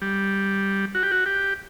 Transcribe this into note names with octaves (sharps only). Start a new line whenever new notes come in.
G3
F#4
G4
F#4
G4